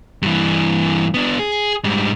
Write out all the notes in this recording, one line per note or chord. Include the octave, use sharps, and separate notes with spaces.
G2 E3
B3 D4
G#4
G#2 G3